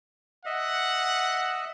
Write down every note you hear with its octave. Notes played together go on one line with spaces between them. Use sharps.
D#5 E5 F#5